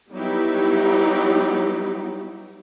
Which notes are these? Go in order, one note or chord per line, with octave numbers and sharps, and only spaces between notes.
F#3 G3 B3 D#4 E4 G4